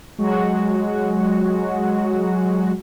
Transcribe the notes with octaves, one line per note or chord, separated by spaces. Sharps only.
F#3 G#3 F#4